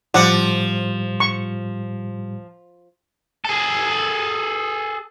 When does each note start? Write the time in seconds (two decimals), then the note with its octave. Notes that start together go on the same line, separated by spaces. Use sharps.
0.14 A2 F3 G3 D5 F#5
1.20 C#6
3.45 G#4 A4